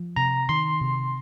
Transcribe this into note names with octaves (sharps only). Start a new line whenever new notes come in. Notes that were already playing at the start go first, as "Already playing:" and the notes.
Already playing: F3
C3 A#5
D#3 C6
C3